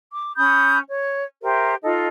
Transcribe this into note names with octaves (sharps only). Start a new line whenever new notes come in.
D6
C#4 B5 D#6 G6
C#5
G4 A#4 C5 E5
D#4 F4 A4 D#5